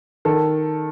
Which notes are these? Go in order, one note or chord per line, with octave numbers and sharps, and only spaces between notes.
D#3 A4